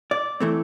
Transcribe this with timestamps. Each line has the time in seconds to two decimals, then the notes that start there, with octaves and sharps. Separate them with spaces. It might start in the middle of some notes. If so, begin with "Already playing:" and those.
0.11 D5
0.40 E3 A3 C4